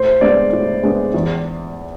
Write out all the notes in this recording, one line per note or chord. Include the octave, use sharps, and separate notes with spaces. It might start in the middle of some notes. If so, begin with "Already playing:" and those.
Already playing: A2 C5
G#3 B3 D4 D5
A2
G#3 B3 D4
E2